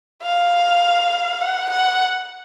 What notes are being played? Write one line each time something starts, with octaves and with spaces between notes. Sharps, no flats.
F5
F#5
F#5